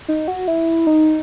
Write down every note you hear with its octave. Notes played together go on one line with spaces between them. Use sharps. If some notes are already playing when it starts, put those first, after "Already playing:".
D#4
F#4
E4
D#4